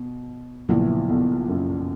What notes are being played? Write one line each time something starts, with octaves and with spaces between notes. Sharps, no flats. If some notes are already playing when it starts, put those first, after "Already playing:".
Already playing: B2
A#1 A#2 C#3 F#3 B3 E4
B1 B2
F#2